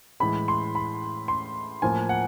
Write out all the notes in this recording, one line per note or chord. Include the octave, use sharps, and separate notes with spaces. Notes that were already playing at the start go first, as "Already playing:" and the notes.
A2 E3 G#3 B5
C6
B5
C6
A2 F3 A#3 G#5
F#5